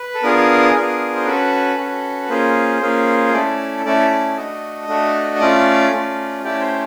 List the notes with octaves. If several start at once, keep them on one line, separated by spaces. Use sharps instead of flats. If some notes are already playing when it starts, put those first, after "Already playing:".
Already playing: B4
A4
B3 D4 F4 G#4 A#4
B3 D4 F4 G#4
C5
C#4 F#4 A4 B4
C#4 F#4 A4
A#3 C#4 F4 G#4 C5
A#3 C#4 F4 G#4
A3 C#4 E4 A4 D5
A3 C#4 E4 A4 D5
D5
A3 D4 F#4 A4 D#5
A3 D4 F#4 A4
A3 C#4 F4 D5
A3 C#4 F4
A3 C#4 E4 G4 D5
C5